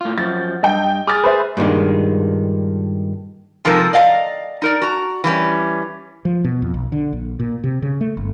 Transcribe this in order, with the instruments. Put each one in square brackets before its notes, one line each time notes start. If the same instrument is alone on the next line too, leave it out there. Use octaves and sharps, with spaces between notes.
[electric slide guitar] A2 F4
[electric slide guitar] F#2 F3 [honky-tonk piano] A6
[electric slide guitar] G2 [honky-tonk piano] D#5 G5
[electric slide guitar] G#4 [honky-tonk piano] D6 F6 A6
[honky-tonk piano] B4 C5 E5
[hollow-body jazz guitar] G2 A#2 D#3 G#3
[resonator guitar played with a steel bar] C3 F3 G#3 D#4 A4 A#4
D5 D#5 F5 G#5 A#5
D#4 A#4 D5
F#4 A#5
E3 G3 A#3 C#4
[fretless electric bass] F3
B2
F2
B1
D3
A#1
A#2
C3
C#3
A3
G1